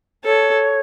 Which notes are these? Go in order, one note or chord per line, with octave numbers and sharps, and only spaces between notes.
A4 C#5